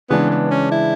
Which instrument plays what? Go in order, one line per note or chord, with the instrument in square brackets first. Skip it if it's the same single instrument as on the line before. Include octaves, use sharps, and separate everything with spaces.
[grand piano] C#3 E3 G#3 D4 [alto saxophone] B3
[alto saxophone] B3
C#4
E4